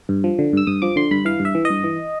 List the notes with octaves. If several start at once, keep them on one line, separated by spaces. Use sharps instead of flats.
G2
F3
D3
G2 E6
G2 D#6
F3 D6
D3 C6
G2 B5
E3 F5
G2
E5
E3
D#5
G2
E3